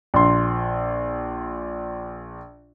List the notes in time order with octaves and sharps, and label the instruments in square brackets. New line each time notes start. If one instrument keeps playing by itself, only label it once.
[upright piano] A#1 C6